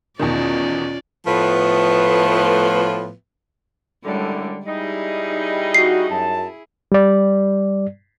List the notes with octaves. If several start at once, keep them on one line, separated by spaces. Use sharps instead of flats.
E2 B2 D#3 C#4 F4 D5
A2 F3 A3 B3 F4 B4
F#2 A2 D3 G3 G#3
G3 D#4 E4 G#4
F#4 C7
F#2 A5
G3 D5